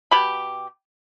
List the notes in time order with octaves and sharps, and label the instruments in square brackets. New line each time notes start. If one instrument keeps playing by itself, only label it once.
[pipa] B2 G4 B5